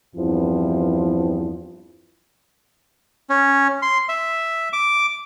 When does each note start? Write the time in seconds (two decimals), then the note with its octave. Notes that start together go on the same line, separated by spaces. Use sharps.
0.16 E2 G2 F3 C4 E4
3.30 C#4
3.82 C6
4.09 E5
4.73 D6